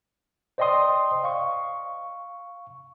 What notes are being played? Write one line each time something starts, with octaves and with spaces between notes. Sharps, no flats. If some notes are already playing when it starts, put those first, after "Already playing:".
C5 D5 D#5 G5 C6 D#6
F5 C#6